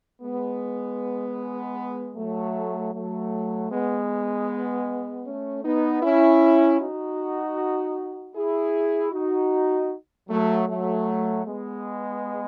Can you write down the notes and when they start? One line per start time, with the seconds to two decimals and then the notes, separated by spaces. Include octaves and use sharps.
0.21 G#3 B3
2.16 F#3 A3
2.93 F#3 A3
3.71 G#3 B3
5.25 A3 C#4
5.64 B3 D#4
6.02 C#4 E4
6.81 D#4 F#4
8.35 E4 G#4
9.12 D#4 F#4
10.29 F#3 A3
10.68 F#3 A3
11.45 G#3 B3